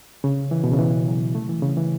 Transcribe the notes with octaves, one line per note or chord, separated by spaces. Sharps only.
C#3
E3
B2
C#3
E3
F#3
A3
E3
C#3
E3